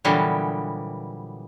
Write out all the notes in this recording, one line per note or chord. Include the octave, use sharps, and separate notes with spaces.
A#2 D3 E3 F#3 G3 B3